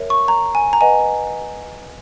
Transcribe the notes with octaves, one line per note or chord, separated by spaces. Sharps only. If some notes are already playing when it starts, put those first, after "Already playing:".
Already playing: A#4 C#5 E5
C#6
A#5
G#5
A#5
B4 D#5 F#5 G#5